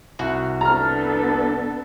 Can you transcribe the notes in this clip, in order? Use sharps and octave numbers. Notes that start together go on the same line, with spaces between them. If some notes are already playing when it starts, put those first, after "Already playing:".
C2 F#4
B3 D4 A4 A#5 F6